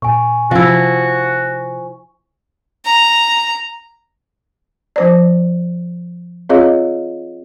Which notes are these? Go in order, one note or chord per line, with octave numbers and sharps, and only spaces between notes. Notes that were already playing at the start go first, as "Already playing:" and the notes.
A#2 G#5 C#6
C3 F3 E4 F#4
A#5
F3 C5 D5
C4 F4 G#4 C#5 D#5 F5